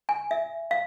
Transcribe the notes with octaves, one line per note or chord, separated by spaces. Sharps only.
G#5
E5
F5